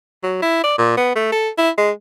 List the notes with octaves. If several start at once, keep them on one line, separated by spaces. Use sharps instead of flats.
F#3
E4
D5
A#2
B3
A3
A4
E4
G#3